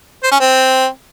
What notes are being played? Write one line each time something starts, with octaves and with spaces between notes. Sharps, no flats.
C5
C#4
C4